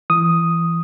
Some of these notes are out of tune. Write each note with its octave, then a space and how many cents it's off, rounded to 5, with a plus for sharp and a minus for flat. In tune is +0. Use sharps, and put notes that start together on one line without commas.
E3 +25 D#6 +0